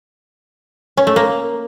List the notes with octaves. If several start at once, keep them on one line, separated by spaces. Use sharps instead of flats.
C#4
A3
A#3